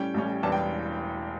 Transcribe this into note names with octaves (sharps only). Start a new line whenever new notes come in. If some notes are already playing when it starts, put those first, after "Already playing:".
Already playing: A2 G3 C#4 G5
A1 A2 G3 C#4
E1 E2 E3 G3 D4 A5
G5